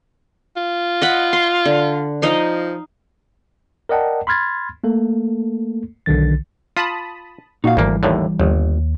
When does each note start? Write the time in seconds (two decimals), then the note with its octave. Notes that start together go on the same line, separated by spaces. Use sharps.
0.56 F4
1.02 D#5 F#5 B5
1.33 C6
1.65 D3
2.22 F3 D#4 D#5 F5
3.89 A#4 D5 D#5 F#5 G5 A5
4.27 B5 C6 F6 G#6 A6
4.84 A3 A#3 A4
6.06 B1 D3 D#3 A6
6.77 F4 A5 B5 D#6
7.64 A#2 D#4 F#4 F5
7.77 G#1 D2 E3 G3 A#3
8.03 D#2 A2 D3
8.40 G1 D#2